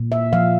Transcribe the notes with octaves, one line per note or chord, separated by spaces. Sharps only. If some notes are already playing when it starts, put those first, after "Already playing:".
Already playing: A#2
E5
F3 F5